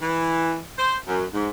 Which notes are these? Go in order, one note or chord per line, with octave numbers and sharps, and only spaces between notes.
E3
C5
F#2
G#2